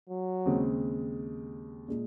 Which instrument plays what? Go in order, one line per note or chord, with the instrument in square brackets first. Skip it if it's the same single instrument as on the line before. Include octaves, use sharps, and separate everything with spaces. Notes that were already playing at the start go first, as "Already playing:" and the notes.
[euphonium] F#3
[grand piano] D#2 C#3 G#3 C4
A#2 G#3